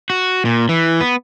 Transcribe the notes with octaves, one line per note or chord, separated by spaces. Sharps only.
F#4
A#2
E3
B3